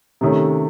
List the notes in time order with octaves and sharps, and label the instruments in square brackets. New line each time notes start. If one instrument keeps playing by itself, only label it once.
[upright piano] C3 D#3 A3 C#4